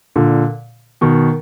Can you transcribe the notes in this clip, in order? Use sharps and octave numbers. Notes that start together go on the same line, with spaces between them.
A#2 D3
B2 D#3